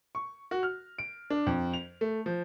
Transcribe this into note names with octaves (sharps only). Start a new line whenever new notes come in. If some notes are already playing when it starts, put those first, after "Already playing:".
C#6
F#4
F6
D7
D4
F2
F7
A3
F3